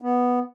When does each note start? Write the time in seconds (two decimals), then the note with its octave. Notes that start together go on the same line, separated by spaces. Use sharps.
0.02 B3